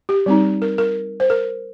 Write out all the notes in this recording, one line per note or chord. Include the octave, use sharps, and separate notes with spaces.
G4
G3 C4 D#4
A#4
A#4
C5
A#4